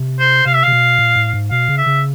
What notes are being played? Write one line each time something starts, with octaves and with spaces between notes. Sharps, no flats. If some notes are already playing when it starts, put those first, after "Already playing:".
Already playing: C3
C5
C3 F5
E5
C3 F5
B2
A#2
A2
G#2
B2 F5
C#3
E5
C#3